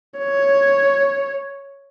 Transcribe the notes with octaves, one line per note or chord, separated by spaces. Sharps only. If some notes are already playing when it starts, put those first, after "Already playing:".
C#5